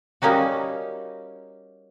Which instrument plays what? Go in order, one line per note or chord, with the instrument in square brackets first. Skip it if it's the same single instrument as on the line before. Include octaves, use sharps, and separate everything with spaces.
[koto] G3 A#3 C#4 D#4 F#4